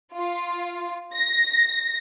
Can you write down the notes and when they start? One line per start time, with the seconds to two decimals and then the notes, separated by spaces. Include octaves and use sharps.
0.15 F4
1.14 A#6